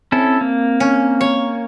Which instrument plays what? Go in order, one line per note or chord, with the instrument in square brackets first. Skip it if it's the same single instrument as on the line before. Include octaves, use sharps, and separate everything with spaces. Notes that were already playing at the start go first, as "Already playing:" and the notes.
[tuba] C4 [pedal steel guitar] C#4 E4 A4
[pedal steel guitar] A#3 [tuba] C4
[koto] C#4
C#5